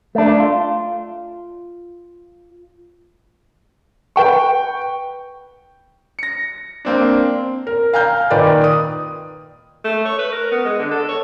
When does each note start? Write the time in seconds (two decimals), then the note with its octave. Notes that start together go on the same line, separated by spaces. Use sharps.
0.15 A3 D4
0.40 F4
4.16 B4 G5 C#6
6.19 A#6 C#7
6.85 A#3 C4 D4
7.67 A#4
7.93 F5 G#5 A#5 F6 G6
8.30 A#2 D#3 A#4 B4 D5 G5
8.64 D#6
9.85 A3
10.05 C#5
10.19 B4
10.32 A#4
10.52 B3
10.65 G#3
10.78 D3
10.91 A4
11.09 C#5